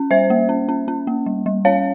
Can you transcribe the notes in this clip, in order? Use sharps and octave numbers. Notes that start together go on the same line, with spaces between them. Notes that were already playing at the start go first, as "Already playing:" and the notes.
Already playing: C#4
G3 C5 E5
A#3
C#4
C#4
C#4
A#3
G3
G3
C#4 C#5 F5